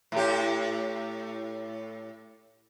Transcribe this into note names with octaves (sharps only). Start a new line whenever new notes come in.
A2 G4